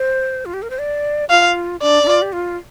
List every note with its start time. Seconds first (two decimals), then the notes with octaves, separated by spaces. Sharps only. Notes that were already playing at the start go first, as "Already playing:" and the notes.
Already playing: C5
0.45 F4
0.54 G4
0.62 A#4
0.70 C5
0.79 D5
1.30 F4 F5
1.82 D4 D5
2.03 D4
2.07 F4
2.22 G4
2.33 F4